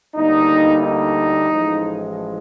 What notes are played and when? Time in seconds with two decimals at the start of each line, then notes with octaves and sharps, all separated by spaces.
0.15 D2 D3 G3 A#3 D#4
0.82 D#4
1.50 A1 A2 F3 G#3